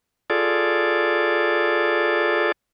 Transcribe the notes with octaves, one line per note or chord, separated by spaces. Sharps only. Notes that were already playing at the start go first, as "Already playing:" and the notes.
F4 G#4 A4 D5